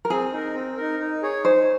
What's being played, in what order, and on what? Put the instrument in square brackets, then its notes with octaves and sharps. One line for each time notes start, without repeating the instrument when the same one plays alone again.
[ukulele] A#4
[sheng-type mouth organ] C4 [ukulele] G#4
[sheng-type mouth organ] D#4 A#4
C4
D#4 A#4
D#4
G#4 C#5
[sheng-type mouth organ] D#4 [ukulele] C5